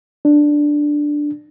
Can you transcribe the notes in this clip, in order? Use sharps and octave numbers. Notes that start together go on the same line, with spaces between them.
D4